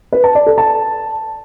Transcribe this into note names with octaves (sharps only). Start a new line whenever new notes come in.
B4
A5
D5
A4
A5